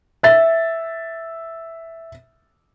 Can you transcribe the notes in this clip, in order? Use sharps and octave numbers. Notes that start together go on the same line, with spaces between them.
E5 A6